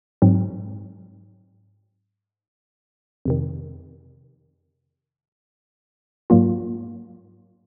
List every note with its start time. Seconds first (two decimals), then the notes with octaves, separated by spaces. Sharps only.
0.22 G#2 F#3 C4
3.25 F2 C3 D#3
6.30 G#2 F#3 A#3 F4